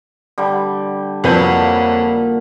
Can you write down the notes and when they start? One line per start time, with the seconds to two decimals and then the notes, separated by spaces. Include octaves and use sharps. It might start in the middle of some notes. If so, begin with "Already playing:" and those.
0.38 D3 G3
1.24 F2 A#2 F#3 B4 G6